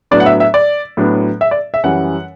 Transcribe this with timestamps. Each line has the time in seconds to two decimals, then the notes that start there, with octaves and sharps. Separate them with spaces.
0.11 A2 F#3 B3 D4 D5
0.20 F#5
0.26 E5
0.40 E5
0.54 D5
0.97 A2 F#3 B3 D4
1.41 E5
1.51 D5
1.74 E5
1.83 F#2 E3 G3 C#4 F#5